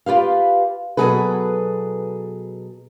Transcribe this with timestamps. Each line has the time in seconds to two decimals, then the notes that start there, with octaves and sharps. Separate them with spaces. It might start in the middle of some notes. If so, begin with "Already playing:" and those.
0.06 F4 G4 B4 F5
0.97 B2 D#3 F#3 G#4 A4 B4